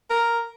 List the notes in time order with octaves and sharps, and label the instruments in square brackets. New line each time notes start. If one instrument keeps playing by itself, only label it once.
[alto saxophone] A#4